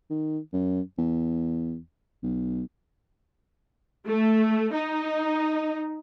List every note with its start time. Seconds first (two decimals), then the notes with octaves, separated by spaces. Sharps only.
0.10 D#3
0.53 F#2
0.98 E2
2.23 B1
4.07 A3
4.74 D#4